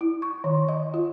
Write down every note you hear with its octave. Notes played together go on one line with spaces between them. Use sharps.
E4
C#6
D#3
D#5
F4